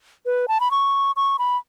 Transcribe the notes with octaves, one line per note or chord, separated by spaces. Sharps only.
B4
A5
B5
C#6
C#6
B5